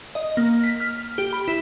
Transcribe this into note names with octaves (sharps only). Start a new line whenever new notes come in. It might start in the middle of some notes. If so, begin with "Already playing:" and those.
D#5
A#3
B6
F6
G4
B5
E4